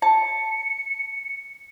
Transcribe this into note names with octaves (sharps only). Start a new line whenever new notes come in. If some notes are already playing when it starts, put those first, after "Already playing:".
A5 C#7